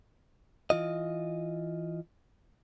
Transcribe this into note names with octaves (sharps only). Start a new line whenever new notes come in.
E3 F4 D#5